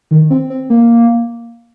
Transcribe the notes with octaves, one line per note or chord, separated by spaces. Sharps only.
D#3
C4
C4
A#3